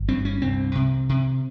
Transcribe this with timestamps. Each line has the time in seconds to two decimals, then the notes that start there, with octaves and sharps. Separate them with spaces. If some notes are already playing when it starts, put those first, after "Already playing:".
Already playing: G1
0.08 G2 C4
0.25 C#4
0.41 C2 C4
0.75 C3
1.09 C3